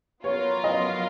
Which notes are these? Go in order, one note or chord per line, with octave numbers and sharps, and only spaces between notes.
F#3 B3 F4 A#4 C#5
D#5